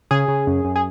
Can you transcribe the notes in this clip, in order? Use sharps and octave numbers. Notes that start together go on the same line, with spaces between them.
C#3 G#4
C#3
F#2
F#2
G#4